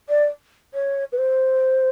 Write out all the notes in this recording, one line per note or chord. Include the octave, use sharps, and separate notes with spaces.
D5
C#5
B4
C5